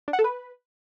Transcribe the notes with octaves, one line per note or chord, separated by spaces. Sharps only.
D4
F#5
A4
B4